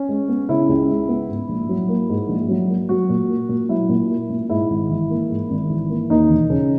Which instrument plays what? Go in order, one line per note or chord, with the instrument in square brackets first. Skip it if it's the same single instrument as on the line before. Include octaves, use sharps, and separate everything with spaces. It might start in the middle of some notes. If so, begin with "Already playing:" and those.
Already playing: [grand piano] C#4
[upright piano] G#3
B3
[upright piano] C#3 [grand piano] E4
[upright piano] C#2
G#3
B3
G#2
A#1
F#3
A#3
G#2
A#1
F#3
A#3
[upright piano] F#3 [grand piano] F#4
[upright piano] A#2
A#3
A#2
[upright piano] F#3 [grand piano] E4
[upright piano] A#2
A#3
A#2
[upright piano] G#2 [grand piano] E4
[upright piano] G#1
E3
A#3
G#2
G#1
E3
A#3
[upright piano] D#2 [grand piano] D#4
[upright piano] E1
C#3